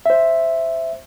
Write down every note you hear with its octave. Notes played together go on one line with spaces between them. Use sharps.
C5 E5